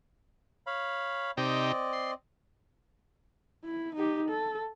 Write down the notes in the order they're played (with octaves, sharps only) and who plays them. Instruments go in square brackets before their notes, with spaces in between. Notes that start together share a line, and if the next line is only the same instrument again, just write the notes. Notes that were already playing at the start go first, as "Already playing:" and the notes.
[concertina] C#5 F5 B5
[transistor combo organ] C3 D#4 G4 [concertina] C4 D5 D#5
[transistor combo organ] C6
[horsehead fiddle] E4
D#4 G4
A4